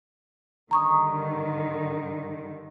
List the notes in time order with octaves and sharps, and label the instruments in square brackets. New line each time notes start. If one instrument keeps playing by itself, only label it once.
[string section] G2 D3 D#3 [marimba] A#5 C#6 D#6